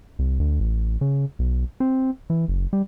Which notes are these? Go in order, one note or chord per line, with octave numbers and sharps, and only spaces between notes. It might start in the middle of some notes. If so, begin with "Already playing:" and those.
C2
D2
A1
C#3
B1
C4
E3
F#1
G3